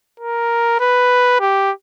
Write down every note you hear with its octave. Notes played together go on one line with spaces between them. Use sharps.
A#4
B4
G4